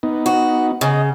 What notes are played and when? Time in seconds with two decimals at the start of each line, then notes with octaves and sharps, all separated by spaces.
0.03 B3 D#4
0.26 F#4
0.81 C#3 D#5